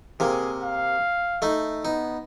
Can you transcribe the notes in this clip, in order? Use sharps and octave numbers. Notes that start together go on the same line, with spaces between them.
C3 A#3 G#4
F5
A3 D#4
B3 D#4